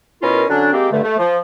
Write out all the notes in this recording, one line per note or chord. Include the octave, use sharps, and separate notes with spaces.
B2 C#4 E4 F4 A#4
D3 F#3 C#4 D4
G#3 A#3 C4 G4
G2 D3 A3
A3
F3